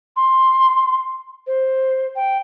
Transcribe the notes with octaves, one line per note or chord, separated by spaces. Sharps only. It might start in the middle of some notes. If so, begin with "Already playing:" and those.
C6
C5
G5